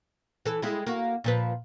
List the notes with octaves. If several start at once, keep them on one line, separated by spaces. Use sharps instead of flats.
E3 A4
G3 G#3 E4
A#3 F#4
A#2 F3 B4